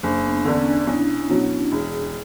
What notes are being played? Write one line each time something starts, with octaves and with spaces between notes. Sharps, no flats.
F#1 D4
B3
E2 D3 C#4
D4
B1 E4
B2 F#3 E4
E1 G#4